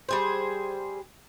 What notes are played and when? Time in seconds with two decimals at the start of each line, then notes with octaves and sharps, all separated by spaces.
0.09 G3 G#4 C5